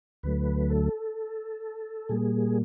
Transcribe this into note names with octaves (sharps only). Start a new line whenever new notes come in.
D2 D3 F#3 A3 B4
A4
A#2 G3 A#3 G#4